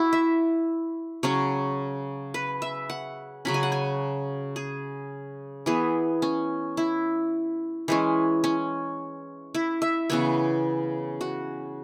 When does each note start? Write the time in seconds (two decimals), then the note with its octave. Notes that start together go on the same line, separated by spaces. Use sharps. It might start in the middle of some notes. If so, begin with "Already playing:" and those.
Already playing: E4 F#4
0.13 E5
1.23 C#3 F#3 C#4 C#5
2.34 B4
2.62 E5
2.90 F#5
3.45 C#3 F#3 C#4 B5
3.54 G#5
3.63 F#5
3.72 G#5
4.56 G#4
5.66 E3 B3 G#4
6.22 C#4
6.77 E4
7.88 E3 G#3 C#4
8.44 C#4
9.54 E4
9.82 E5
10.10 C#3 E3 B3 C#5
11.21 F#4